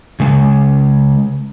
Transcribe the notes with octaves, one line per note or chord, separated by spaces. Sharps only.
C#3 G#3